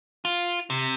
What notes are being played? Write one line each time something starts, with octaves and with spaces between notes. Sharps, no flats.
F4
C3